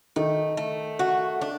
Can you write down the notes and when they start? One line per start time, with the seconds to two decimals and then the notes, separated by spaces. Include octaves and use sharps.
0.16 D#3 A3 D#4
0.57 A3
0.99 F#4
1.42 D4